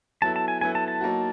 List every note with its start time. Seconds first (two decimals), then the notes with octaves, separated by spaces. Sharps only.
0.22 F#3 B3 E4 A4 A5
0.36 A5
0.48 G#5
0.61 F#3 B3 E4 A4 G#5
0.75 A5
0.88 A5
1.01 F#3 A#3 D#4 F#4